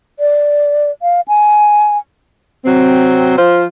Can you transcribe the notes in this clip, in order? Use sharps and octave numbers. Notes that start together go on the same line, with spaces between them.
D5
F5
G#5
C3 F#3 C4
F3 F4 C5